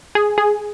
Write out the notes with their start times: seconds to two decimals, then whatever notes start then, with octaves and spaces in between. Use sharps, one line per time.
0.15 G#4
0.38 G#4